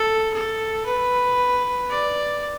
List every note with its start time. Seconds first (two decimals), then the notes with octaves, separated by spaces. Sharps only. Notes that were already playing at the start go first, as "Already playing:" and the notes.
Already playing: A4
0.34 A4
0.86 B4
1.90 D5